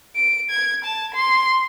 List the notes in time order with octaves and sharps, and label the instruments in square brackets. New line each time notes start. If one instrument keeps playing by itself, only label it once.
[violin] D7
G#6
A5
C6